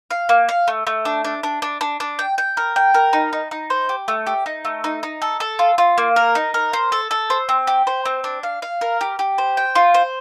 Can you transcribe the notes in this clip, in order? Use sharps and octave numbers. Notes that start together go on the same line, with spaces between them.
F5
A#3
F5
A3
A3
D4
D4
D4
D4
D4
D4
G5
G5
A#4
G5
A#4
D#4
D#4
D#4
C5
G4
A3
G4
D#4
A3
D#4
D#4
A4
A4
F4
F4
A#3
A#4
D#4
A#4
C5
A4
A4
C5
C4
G4
C5
C4
D4
F5
F5
A#4
G4
G4
C5
G5
F4
C5